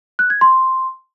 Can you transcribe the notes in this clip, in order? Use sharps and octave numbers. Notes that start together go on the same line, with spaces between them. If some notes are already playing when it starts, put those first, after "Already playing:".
F#6
G#6
C6